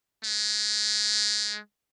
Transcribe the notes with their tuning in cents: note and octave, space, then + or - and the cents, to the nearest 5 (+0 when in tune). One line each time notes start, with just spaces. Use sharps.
G#3 +25